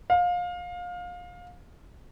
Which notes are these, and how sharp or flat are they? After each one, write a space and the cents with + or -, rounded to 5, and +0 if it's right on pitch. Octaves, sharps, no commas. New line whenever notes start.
F5 +25